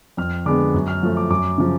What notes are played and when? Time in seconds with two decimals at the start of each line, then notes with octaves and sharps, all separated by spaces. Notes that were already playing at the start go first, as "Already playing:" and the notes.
0.17 F2 F6
0.46 D3 G#3 B3 D6
0.74 F#2
0.88 F6
1.03 F3 A3
1.17 D6
1.30 F#2 D6
1.58 C#3 F3